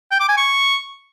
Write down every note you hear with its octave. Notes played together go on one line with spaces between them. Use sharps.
G5
D6
G#5
C#6